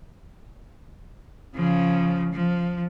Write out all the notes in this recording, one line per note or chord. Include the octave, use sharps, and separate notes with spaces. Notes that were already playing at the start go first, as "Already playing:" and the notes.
C#3 F3
F3